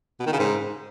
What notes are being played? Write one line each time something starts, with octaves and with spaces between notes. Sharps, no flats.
B2
D#3
C#3
G#2